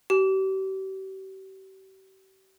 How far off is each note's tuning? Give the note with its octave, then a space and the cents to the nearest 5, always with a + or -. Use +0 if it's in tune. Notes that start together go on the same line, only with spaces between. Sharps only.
G4 -40